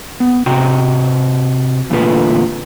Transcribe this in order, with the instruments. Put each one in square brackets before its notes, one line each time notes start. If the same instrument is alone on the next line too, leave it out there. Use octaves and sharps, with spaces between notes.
[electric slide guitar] B3
C3 F#4 G5 A#5
E2 A#2 D3 A3 F4 B4